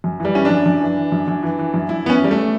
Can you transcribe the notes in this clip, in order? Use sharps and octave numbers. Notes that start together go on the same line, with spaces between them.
F#2
E3 G3
E3 C#4
D4
F#2
F#2
E3
E3
F#2
F#2
E3
E3
F#2
F#2 E4
E3 B3 C#4
E3 G3
A3